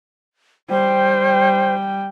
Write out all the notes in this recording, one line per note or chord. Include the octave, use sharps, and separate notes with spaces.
G3 C5 G5